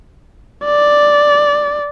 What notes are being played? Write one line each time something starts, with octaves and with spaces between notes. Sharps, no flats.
D5